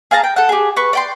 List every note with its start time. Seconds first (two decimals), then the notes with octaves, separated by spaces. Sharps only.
0.11 G#4 F5 A5 A#5
0.24 G5
0.36 A4 F#5
0.49 G4 G#4
0.77 B4 C#6
0.93 D5 G5 C6